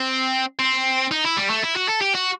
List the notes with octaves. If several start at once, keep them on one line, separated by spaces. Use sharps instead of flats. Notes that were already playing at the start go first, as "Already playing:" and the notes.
Already playing: C4
C4
D#4
E4
G3
A3
E4
F#4
A4
G4
F#4